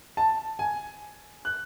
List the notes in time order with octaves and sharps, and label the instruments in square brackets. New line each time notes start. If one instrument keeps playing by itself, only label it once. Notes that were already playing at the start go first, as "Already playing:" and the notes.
[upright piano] A5
G#5
F#6